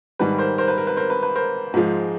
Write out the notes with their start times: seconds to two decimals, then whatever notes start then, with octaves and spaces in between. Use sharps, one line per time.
0.19 G#2 D#3 G3 B4
0.38 A#4 C5
0.58 A#4 C5
0.68 B4
0.78 A#4
0.87 B4
0.97 A#4 C5
1.10 B4
1.23 B4
1.35 A#4 C5
1.74 G#2 F3 G#3